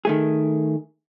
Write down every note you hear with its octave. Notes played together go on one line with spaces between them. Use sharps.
D#3 A3 G#4